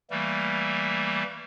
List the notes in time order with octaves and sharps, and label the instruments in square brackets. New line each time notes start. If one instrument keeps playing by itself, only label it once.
[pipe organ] E3 G3 A3 A#3